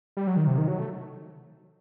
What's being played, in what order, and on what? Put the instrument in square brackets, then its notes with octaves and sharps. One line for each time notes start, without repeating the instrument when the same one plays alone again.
[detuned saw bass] G3
F#3
D#3
C3
D#3
F#3
A3